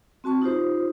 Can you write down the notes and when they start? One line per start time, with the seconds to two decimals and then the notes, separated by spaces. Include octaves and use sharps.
0.24 C4 F#4 A5 C#6
0.42 D#4 F4 G4 C5